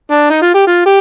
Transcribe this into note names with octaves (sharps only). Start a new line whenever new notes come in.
D4
D#4
F4
G4
F4
G4